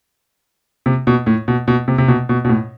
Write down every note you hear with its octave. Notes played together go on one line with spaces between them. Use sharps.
C3
B2
A2
B2
B2
C3
C3
B2
B2
B2
A2